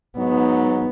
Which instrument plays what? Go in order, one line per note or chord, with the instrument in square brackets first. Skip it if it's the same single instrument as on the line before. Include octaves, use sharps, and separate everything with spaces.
[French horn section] G#2 F#3 D#4 [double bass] B3